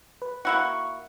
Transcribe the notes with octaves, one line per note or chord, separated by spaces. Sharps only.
B4
A#3 E4 F#4 C#6